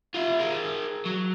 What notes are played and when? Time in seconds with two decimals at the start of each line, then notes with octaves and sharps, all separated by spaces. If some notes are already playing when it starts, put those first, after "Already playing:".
0.15 F4 E5
0.39 G#4 A#4
1.05 F#3